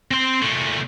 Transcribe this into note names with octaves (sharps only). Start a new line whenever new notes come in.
C4 C6
A#2 A3